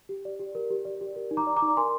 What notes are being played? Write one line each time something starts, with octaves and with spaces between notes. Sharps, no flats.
G4
D5
G4
A#4
G4
D5
G4
A#4
D#4
A#5 D6
D5
A#5 D6
D#4
A#4 G#5 C6